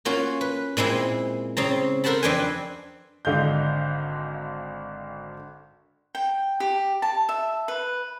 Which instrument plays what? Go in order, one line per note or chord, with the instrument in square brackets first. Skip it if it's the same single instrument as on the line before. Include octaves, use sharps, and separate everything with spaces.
[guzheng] A#3 C#4 F4 F#4
B4
A#2 G#3 C4 E4
C#3 C4 A#5
A4 A#4 C5 F#5 A5 B5
F2 C4 D4 B4 G5 G#5
[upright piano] G#1 D3 D#5 F5 G6
[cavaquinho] G5
G4
A5
E5
B4